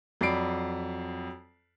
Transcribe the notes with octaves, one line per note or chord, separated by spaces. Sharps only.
F2 F#3 D5 B5 C7 D7